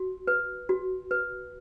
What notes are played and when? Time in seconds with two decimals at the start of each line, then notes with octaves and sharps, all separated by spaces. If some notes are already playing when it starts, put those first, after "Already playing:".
Already playing: F#4
0.27 B4
0.69 F#4
1.11 B4